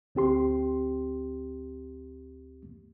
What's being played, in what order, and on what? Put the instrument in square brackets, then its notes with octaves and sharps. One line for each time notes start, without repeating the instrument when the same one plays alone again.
[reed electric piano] D2 C4 G4 C6